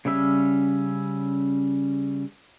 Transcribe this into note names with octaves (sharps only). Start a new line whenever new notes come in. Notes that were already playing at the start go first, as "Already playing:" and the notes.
C#3 G3 C#4 E5